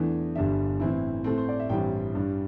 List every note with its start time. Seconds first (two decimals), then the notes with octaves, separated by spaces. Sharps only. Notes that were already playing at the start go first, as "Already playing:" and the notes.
Already playing: E2 E3 A3 D4
0.35 G1 G2 G3 D4 E5
0.80 A2 E3 C4 E4
1.24 A2 A3 C4 A4
1.38 C5
1.49 D5
1.59 E5
1.69 A1 G2 G3 C4 E4 G5
2.14 G2 G3 D4